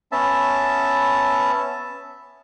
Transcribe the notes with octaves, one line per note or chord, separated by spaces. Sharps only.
B3 C#4 E5 A5